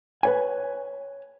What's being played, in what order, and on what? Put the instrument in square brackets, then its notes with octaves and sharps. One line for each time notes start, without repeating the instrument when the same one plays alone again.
[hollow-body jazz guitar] B4 C#5 G#5